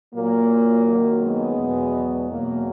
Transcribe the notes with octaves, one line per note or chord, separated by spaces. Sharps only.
A#2 F#3 A#3
F#2 D#3 F#3
G#3 B3
E2 B2 F#3
E2 B2 F#3 A#3